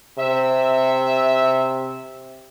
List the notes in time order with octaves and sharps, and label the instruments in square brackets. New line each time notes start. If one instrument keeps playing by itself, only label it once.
[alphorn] C3 [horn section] E5